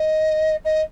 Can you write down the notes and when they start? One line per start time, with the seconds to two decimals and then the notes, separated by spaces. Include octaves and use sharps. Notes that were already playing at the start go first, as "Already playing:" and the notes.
Already playing: D#5
0.65 D#5